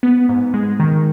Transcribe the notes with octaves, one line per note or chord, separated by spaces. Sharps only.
B3
G#2
G#3
D#3